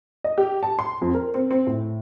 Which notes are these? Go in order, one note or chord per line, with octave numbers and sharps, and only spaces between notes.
D#5
G4
A5
C6
F2
A#4
C4
C4
A2